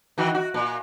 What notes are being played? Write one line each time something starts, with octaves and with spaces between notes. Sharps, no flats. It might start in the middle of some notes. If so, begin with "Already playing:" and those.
D#3 E3 F#4
F#4
A#2